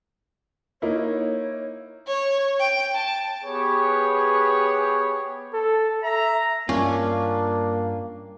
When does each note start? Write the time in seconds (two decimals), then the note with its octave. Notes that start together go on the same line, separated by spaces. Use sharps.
0.82 A#3 D#4 E4 C#5
2.07 C#5
2.60 G5
2.94 A5
3.44 B3 G4 G#4 B4 C#5
5.54 A4
6.03 E5 A#5
6.69 G2 A#3 C#4 D4 F4